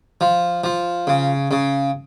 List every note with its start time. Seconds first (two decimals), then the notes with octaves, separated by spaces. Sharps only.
0.21 F3
0.64 F3
1.07 C#3
1.51 C#3